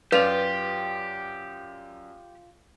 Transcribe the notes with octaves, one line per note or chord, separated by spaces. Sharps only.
F#2 F4 G4 B4 D5 F7